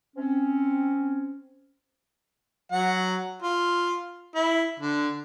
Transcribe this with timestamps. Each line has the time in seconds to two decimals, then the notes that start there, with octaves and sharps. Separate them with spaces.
0.17 C4 C#4
2.72 F#3 F#5
3.42 F4
4.35 E4
4.79 D3